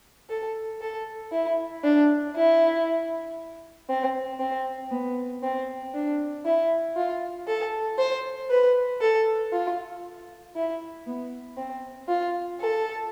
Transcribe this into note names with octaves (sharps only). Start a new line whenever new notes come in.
A4
A4
E4
D4
E4
C4
C4
B3
C4
D4
E4
F4
A4
C5
B4
A4
F4
E4
B3
C4
F4
A4